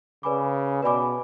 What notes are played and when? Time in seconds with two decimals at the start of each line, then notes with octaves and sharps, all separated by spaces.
0.23 C#3 B4 D5 G#5 B5 D6
0.82 B2 B4 D5 G#5 B5 D6